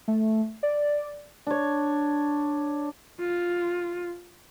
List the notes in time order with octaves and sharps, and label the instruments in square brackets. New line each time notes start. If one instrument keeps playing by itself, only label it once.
[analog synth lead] A3
D5
[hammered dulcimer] D4 C#5
[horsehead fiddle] F4